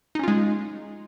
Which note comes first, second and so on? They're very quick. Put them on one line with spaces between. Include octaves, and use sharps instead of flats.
D#4 C#4 F4 G#3